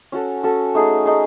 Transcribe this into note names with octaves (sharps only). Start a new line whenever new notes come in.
C#4 F#4 A4
C#4 F#4 A4
A3 D#4 G#4
A3 D#4 G#4